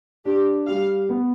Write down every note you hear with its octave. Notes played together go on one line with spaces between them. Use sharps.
D4 G4
G3 F5
B3